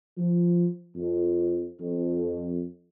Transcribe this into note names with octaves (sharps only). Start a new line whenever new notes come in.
F3
F2
F2